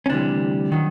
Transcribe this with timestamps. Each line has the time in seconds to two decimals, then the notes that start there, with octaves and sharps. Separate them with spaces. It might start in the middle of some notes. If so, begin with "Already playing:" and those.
0.06 C#4
0.10 D2 C3 E3 G3 D4
0.72 D#3 F#3